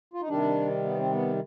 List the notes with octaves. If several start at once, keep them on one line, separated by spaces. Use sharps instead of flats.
F4
D#4
C3 D#3 G3 D4
B3
C4
B3